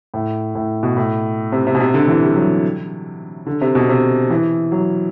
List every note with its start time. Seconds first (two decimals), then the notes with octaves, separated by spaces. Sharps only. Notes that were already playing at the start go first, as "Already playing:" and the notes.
0.14 A2
0.55 A2
0.83 B2
0.97 A2
1.52 C3
1.67 C3
1.75 B2
1.80 C3
1.94 D3
2.08 E3
2.22 G3
2.36 F#3
3.46 D3
3.61 C3
3.75 B2
3.89 C3
4.30 E3
4.72 F#3